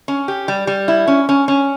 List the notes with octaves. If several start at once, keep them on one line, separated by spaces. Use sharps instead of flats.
C#4
G4
G3
G3
E4
C#4
C#4
C#4